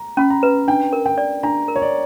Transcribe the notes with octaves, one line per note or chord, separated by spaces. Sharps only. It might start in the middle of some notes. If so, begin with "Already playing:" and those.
Already playing: A#5
C#4 B5
A#5
B4
D4 G5
A#4
G5
D5
D4 A#5
A#4
C#5
D5